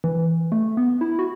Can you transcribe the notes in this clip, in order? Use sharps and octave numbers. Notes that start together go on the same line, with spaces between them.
E3
A3
B3
E4
F#4